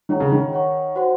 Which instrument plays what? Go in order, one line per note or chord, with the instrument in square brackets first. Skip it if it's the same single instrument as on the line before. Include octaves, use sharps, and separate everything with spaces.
[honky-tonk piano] D#3 [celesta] F4 G#4 C#5 F#5 A#5
[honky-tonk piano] C#3
D#3
[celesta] C#5 F#5 C#6
F#4 C5 F#5 C6